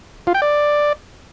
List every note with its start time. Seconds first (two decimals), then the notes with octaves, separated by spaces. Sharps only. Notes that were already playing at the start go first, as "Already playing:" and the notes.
0.27 F4
0.34 G5
0.42 D5